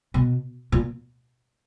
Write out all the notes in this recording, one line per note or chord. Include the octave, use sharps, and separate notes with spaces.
B2
A#2